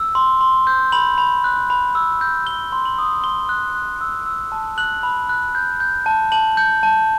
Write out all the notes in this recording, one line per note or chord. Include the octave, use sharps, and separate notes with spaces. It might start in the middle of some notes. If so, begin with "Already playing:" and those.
Already playing: E6
C6
C6
G6
B5 F#7
B5
F#6
B5
E6
G6
G6 G7
C6
F#7
D#6
C6 G7
F#6
F#6
E6
E6
A5
F#6 F#7
B5
F#6
G6
G6
A5
A5 F#7
G6
A5